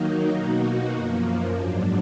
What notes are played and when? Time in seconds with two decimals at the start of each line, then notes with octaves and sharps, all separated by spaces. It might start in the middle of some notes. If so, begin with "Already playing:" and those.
Already playing: D#3 F#3 A#3 D#4
0.33 B2 A#3 D#4 F#4
0.93 F#2 F3 A#3
1.55 G#2 F#3 D4